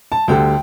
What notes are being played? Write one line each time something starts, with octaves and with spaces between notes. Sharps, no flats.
A5
D2 D3 G3 G5